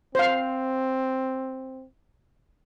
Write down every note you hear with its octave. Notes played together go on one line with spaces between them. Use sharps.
C4 C5 F5